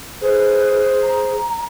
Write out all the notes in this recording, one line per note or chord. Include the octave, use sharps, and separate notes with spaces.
G#4 B4 C5
A#5